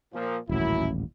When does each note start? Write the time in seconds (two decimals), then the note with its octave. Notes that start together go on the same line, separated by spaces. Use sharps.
0.13 A#2 F3
0.49 D#1 A1 F#2 E4